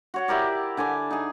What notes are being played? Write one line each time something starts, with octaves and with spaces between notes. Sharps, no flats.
F#4 C#5 F#5
E4 G4 A#4 D5
D3 G#5 A5 D6
D#4 G#4